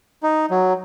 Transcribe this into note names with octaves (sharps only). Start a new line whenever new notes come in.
D#4
F#3